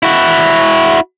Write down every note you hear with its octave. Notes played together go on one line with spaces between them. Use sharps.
E4 F#4